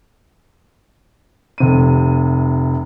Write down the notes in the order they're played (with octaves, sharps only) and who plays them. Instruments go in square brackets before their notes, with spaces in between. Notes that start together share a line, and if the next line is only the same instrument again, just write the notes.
[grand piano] F1 C3 D#7